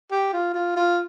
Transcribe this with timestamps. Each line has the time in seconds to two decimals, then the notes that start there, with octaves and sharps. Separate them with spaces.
0.11 G4
0.33 F4
0.54 F4
0.77 F4